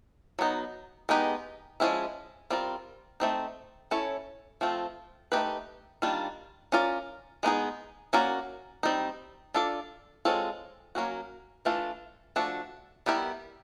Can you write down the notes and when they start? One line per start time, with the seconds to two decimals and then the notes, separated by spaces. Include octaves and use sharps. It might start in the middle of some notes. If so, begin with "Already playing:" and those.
0.39 F#3 B3 D#4
1.09 G#3 B3 D#4 G4 B4
1.80 F3 G#3 C#4 E4
2.50 G3 C4 F4 A#4
3.20 A3 C4 D#4
3.91 C#4 E4 A4 C#5
4.61 F3 A3 C4 F4
5.32 A3 C4 D#4 G4 B4
6.02 D#3 G3 A#3 D4 F4
6.72 C#4 F4 A#4 D5
7.43 G#3 B3 D#4 G#4
8.13 A#3 C#4 F#4 A#4 D5
8.83 G3 C4 D#4
9.54 D4 F4 A4 D5
10.25 G#3 C4 F4 A4 C#5
10.95 F#3 A#3 C#4 F#4
11.65 E3 A3 D4 F4 A4
12.36 F3 A3 D4 F#4 A4
13.06 G3 B3 E4 G4 A#4